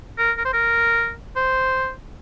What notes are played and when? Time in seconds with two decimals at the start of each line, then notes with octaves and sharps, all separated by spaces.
0.18 A#4
0.38 A#4
0.45 C5
0.53 A#4
1.36 C5